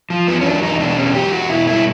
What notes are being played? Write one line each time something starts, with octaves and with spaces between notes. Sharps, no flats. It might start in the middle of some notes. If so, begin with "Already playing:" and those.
F3
E2 B3
C#4
F#3 D4
E2 D#4
B2 D4
E2 C#4
F#3 G4
E2 F#4
B2 E4
G2 E4